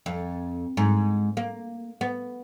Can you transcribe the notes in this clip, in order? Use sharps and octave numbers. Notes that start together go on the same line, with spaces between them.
F2
G#2
A#3
B3